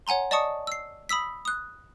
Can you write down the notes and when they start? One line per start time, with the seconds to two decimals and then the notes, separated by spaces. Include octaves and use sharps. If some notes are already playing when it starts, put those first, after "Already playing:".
0.07 C#5 F#5 G#5 A#5 C6
0.31 D5 D#5 A5 C#6 D#6 C#7
0.67 E6 C7
1.09 B5 D#6 E6 B6
1.45 D#6 F#6